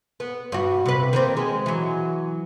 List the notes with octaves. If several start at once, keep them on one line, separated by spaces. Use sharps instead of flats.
B3
G2 F#4
C3 B4
D#3 A#3 C4
G#3
E3 F#3